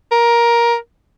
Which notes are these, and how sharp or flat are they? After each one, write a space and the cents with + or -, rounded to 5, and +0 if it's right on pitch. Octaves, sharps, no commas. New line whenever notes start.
A#4 +15